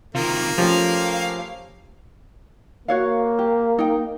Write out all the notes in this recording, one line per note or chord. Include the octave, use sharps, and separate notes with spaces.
C3 D#3 A#3 F4
F3 A3 C#4 G4 F5
A#3 F#4 C#5 F5
G4
D#4 G5